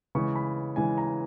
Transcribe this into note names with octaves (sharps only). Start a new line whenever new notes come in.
C#3 E3 G#3 C#6
B5
C#3 E3 G#3 G#5
A#5